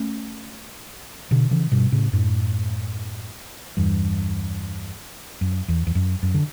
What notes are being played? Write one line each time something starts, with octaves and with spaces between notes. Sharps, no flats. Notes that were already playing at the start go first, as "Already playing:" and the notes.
Already playing: A3 C#4
B2 D3
C#3 E3
G2 B2
A2 C#3
F#2 A2
E2 G2
F#2
E2
E2
F#2
F#2
D3